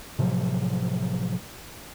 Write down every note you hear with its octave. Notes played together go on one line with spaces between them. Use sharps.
A2 C3 F3 F#3